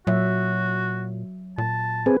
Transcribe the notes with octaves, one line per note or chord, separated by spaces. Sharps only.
A#2 F#3 F#4 C#5 E5
A#2 A5
C4 G#4 B4